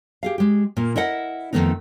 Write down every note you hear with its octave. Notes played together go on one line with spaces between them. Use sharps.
G4 G#4 F5
G#3 G4
A#2 A#3
E4 A#4 D#5 F#5
F2 D3 D#3 A3 B3 D#4